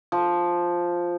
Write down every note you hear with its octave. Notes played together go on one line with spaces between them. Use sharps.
F3